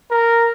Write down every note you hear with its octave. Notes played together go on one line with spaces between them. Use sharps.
A#4